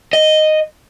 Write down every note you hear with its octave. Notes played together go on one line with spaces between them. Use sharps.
D#5